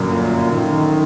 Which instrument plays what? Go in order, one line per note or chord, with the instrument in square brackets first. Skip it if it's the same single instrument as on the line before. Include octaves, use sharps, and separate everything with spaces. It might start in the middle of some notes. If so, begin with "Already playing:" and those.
Already playing: [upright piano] G1 F#2 F#3 A#3 [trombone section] A#2
[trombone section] D#3